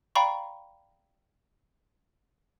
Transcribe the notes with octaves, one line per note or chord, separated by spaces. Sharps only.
D5 F5 G5 A#5 B5 C#6